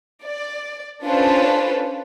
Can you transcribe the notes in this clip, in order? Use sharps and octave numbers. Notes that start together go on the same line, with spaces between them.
D5
C#4 D4 F4 A4 B4 C5